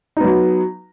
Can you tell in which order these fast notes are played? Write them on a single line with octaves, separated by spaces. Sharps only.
D#4 B3 F#3